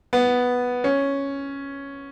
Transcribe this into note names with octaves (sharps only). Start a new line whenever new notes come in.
B3
C#4